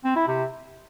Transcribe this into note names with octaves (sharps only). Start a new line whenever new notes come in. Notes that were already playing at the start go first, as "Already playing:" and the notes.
C4
E4
C3